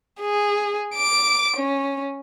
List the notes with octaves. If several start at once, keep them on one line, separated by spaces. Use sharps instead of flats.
G#4
D6 D7
C#4